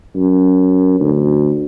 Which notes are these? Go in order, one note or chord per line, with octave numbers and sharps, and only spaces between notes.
F#2
D2